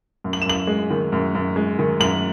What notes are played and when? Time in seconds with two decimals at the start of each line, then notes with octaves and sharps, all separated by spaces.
0.24 F#2
0.33 F#7
0.42 E7
0.46 F#2 F#7
0.67 G#3
0.90 D#3
1.12 F#2
1.35 F#2
1.56 G#3
1.79 D#3
2.00 F#2 F#7